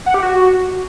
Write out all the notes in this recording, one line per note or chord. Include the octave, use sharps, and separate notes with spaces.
F#5
G4
F#4